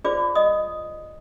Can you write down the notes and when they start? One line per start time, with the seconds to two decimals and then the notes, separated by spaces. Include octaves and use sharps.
0.04 F4 G#4 C5 D5 D6
0.35 D#5 D#6